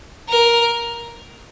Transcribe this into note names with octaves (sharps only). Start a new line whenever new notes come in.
A#4